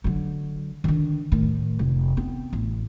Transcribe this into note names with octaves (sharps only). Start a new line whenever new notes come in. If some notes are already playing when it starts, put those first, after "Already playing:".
D3 F#3
D3 D#3
A2 D#3
F1
B3 C4
A1